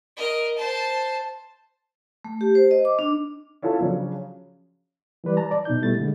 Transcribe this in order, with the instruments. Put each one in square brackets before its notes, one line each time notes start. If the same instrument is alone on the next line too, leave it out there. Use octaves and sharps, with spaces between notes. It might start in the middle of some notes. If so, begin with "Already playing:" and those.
[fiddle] A#4 D#5
C5 A5
[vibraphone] A3
G4
C5
D#5
D6
D4
[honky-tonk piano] C#4 E4 F4 A4
C#3 F3 F#3 C#4 D4
[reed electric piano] E3 G3 B4 D5
A5 A#5
D5
B2 D#4 G6
B2 G3 A3 E4 A6
D3 G#3